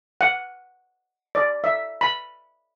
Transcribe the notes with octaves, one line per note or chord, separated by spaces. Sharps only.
F#5
D5
E5
B5